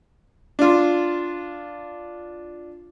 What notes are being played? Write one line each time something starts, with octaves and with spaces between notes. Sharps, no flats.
D4 F4